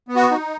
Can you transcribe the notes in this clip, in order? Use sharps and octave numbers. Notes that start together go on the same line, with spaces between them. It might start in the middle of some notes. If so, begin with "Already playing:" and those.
B3
F#4
D#4